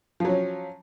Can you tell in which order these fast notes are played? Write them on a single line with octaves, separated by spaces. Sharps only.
F3 F#3 C#4